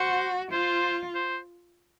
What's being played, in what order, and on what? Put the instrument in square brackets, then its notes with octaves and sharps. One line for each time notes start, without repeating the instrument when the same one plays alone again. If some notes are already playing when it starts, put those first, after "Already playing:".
Already playing: [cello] F#4 [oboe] C5
[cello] F4 [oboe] C5
[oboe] C5